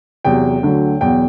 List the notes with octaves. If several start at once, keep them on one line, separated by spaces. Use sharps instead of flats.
E2 C3 F#3 G5
D2 D3 F#3
E2 B2 F#3 G5